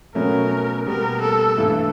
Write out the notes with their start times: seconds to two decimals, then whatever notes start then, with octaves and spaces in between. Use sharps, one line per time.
0.15 B2 F#3 A3 C#4 A#4
0.87 B2 G3 A#3 A#4
1.22 A4
1.57 G2 E3 A3